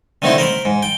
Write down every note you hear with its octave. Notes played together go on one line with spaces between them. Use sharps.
D3 D#3 A3 C4 D#4 E4
A#4 C5 B5
G#2
G5